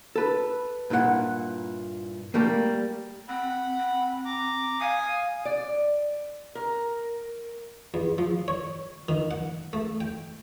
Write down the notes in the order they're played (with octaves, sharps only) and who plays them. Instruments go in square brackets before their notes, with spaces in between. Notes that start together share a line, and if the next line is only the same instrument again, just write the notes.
[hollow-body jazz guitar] A4 B4
G2 A#2 E4 F4 F#5
G3 A3 A#3
[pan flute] C4 [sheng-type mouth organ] F#5 B5
[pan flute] C4
[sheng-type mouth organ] A#5 D6
[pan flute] F5 [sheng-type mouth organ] G#5 D#6
[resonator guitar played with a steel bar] D5
A#4
[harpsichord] E2
F3
C#5
D#3
F#5
A3
G5